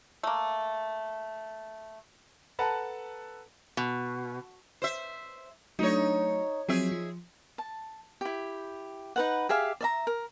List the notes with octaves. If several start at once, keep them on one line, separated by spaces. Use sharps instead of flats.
A3 A#3
A4 B4 F#5 A5 A#5
B2
C5 E5
F#3 A3 D4 D#4 C#5
F3 F#3 C4 G#4 E5
F3
A5
E4 G4
D#4 B4 F#5
G4 G#4 E5 F5
D5 E5 A#5
A#4